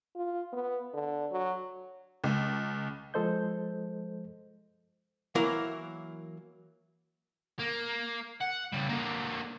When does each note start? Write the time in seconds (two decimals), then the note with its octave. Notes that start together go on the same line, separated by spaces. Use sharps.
0.16 F4
0.53 B3
0.94 D3
1.32 F#3
2.24 C#2
3.14 F3 G#3 A4 C5 D#5 G6
5.35 E3 F#3 A#3 E4 A#4 F5
7.59 A#3
8.41 F#5
8.73 C#3 G3
8.89 D3 A#3